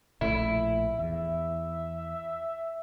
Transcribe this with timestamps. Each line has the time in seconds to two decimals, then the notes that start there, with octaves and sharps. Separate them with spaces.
0.21 A#1 A2 A3 E4
0.99 E2 E5